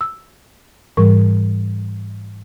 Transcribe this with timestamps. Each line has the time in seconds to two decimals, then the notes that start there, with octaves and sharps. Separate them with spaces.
0.01 E6
0.97 G#2 E3 G3 A#4 C#6